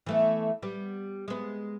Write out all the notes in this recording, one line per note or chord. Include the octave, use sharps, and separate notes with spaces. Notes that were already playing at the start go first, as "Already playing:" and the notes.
E3 A3 B3
G3 B3
G#3 B3